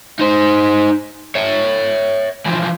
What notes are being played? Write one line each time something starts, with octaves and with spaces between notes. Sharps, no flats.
D#4 C5
C#5 E5
E3 F3